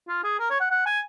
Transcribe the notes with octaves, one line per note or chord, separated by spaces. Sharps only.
F4
G#4
A#4
C#5
F#5
F#5
G#5